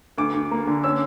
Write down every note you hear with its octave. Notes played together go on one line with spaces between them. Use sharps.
D2 D6
D2
A#3
D3
C#4 E6